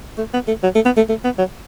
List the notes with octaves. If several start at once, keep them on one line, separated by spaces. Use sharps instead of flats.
A3
B3
A3
F#3
A3
B3
A3
A3
B3
F#3